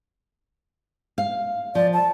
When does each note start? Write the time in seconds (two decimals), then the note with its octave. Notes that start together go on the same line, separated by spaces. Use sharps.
1.18 F5
1.75 F3 D5
1.93 A5